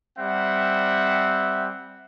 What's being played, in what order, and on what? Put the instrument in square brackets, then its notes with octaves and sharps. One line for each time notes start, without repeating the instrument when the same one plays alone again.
[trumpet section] G3 C4 E5 F#5